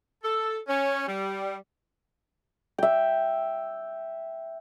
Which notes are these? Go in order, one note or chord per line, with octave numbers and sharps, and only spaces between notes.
A4
C#4
G3
E5 G5